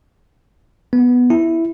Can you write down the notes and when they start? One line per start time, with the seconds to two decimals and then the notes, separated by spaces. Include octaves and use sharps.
0.93 B3
1.30 E4